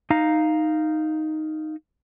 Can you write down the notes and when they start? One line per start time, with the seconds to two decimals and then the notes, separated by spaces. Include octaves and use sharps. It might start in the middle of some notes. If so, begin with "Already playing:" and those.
0.10 D#4 F5 A#5